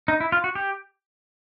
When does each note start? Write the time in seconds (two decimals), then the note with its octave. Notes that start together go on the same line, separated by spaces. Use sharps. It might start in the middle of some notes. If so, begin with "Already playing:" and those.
0.08 D#4
0.21 E4
0.32 F4
0.44 F#4
0.55 G4